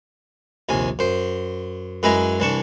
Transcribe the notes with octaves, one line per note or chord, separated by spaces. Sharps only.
A#1 D#2 C3 G#5
F#2 C5
F#2 G#3 E4 B4 G#5 A#5
C2 E3 D4 A5 C#6